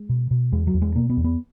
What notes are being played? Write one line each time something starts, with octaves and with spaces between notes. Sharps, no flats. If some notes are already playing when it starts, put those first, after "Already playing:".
Already playing: G#3
B2
B2
E2 G#3
F#3
E2
G#3
B2 A#3
B3
E2
B3